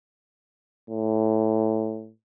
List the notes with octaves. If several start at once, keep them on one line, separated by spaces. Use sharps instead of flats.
A2